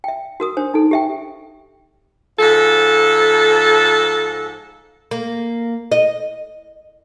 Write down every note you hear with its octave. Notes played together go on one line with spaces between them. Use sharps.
E5 G5
F#4 A#4 D#6
D4 C5
D#4 A4
G4 E5 G5
G#2 F3 A4
A#3
D#5